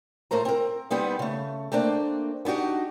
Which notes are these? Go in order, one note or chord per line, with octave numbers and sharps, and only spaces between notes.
A2 A3 A#4 C5 A#5
C4 A#4
G3 B3 C4 D#4
C#3 A3
A3 A#3 C4 D4
B3 D4 D#4 F#4 G4